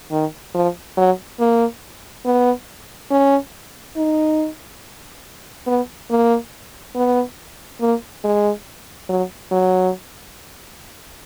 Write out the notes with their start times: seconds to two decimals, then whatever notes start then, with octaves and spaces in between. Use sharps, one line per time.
0.12 D#3
0.54 F3
0.97 F#3
1.39 A#3
2.25 B3
3.10 C#4
3.96 D#4
5.67 B3
6.10 A#3
6.95 B3
7.81 A#3
8.24 G#3
9.09 F#3
9.51 F#3